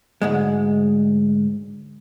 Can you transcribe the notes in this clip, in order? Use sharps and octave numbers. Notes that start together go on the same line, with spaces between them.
D2 G#2 G#3